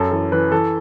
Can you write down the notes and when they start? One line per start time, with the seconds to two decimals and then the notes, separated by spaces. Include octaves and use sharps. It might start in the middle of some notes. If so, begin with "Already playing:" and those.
Already playing: F#2 A4
0.11 E3 A4
0.32 E3 B4
0.52 E3 A4